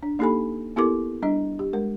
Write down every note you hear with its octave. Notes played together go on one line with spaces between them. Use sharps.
D4
A#3 D#4 G4 A4 G#5 B5
B3 E4 G4 A4 A#4 D6
G3 D4 D#5
G4
G#3 A#4